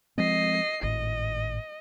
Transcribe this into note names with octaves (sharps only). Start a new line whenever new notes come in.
F3 G#3 C4 D#5 C7
G#1 A2 D#5